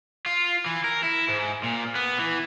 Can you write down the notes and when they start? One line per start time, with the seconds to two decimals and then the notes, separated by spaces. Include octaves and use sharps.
0.26 F4
0.66 E3
0.84 A#4
1.04 E4
1.29 G#2
1.63 A#2
1.95 B3
2.19 E3